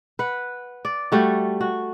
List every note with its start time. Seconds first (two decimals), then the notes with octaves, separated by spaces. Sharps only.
0.19 B4 F#5
0.85 D5
1.12 G3 A3 F#4
1.61 F#4